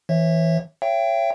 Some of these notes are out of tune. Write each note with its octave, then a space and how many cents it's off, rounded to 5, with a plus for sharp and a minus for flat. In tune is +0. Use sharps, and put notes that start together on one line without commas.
E3 +0 C#5 -25 E5 +0
C#5 -5 E5 +40 G5 +0